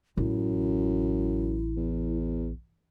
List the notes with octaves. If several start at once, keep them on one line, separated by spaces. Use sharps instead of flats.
A1 F#2 E4
E2